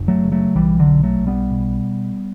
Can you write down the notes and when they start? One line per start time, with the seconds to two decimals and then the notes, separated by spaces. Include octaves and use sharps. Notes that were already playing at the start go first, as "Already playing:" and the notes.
Already playing: F#1
0.08 F#3 A3
0.24 C#3
0.32 F#3 A3
0.55 B1 E3 G3
0.79 D3 F#3
0.87 B2
1.03 F#3 A3
1.19 B1
1.27 G3 B3
1.51 B2